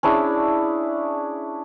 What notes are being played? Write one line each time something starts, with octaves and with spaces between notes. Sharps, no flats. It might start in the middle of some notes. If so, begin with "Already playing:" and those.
C#4 D4 E4 G#4